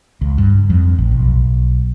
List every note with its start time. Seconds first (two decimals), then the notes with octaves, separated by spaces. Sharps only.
0.21 C#2
0.38 G2
0.70 F2
0.98 A1
1.11 B1